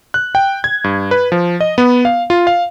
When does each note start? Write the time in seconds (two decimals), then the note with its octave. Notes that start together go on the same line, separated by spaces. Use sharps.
0.14 F#6
0.35 G5
0.64 G#6
0.84 G2
1.11 B4
1.32 F3
1.60 D#5
1.78 B3
2.05 F5
2.30 F4
2.47 F5